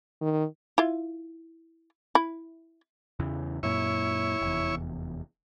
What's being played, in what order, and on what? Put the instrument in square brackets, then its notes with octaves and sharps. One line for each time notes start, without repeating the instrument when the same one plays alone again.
[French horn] D#3
[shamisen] E4 F4
E4
[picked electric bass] E2 C#3 E3
[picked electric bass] F#2 A#2 [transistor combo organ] E4 C#5
[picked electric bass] F1 E2